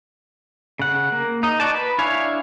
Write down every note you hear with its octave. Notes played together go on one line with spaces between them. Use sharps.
C#3 F#5
A#3
D#4 D#5
F#4 D5 A5
B4
D4 E4 C#5 F5 G#5